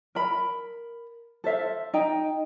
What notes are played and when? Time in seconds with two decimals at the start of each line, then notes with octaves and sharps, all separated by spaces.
0.15 A#4 B5
1.44 A4 C5 E5 F5
1.94 D#4 D#5 G5